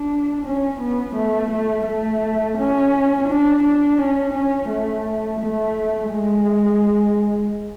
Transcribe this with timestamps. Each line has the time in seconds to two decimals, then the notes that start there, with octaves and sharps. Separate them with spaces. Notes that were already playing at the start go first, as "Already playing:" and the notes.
Already playing: D4
0.45 C#4
0.80 B3
1.15 A3
1.51 A3
1.86 A3
2.57 C#4
3.28 D4
3.63 D4
3.98 C#4
4.34 C#4
4.69 A3
5.40 A3
6.11 G#3